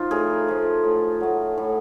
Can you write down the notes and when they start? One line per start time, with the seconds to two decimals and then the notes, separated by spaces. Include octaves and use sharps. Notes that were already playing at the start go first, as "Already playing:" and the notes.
Already playing: F3 D#4 F4
0.11 A2 G#4 A#4
0.48 F3 A3
0.84 A2
1.20 F#3 A3
1.57 A2